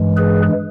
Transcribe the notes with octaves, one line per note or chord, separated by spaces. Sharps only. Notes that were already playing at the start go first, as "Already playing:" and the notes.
Already playing: G2 E3 G#3
G#4 B4